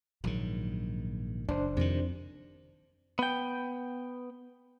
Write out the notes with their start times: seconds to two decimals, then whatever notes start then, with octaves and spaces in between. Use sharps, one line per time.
0.24 A#1 G#2 D#3 F#3
1.49 F#1 D4 D#4 C5
1.77 F2 C3 D#3 E4
3.19 B3 G5